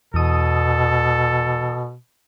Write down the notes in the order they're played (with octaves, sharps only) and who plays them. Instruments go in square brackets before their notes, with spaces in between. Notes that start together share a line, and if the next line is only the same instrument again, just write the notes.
[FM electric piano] E2 D#6 [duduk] B2 [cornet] A4